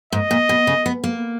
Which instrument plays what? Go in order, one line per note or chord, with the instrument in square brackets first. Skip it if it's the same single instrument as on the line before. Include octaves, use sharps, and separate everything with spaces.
[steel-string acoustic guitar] G#2 [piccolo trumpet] D#5
[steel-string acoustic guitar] A#2
B2
C#3
B3
A#3